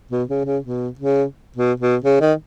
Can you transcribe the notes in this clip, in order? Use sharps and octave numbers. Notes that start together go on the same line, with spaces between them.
B2
C#3
C#3
B2
C#3
B2
B2
C#3
D#3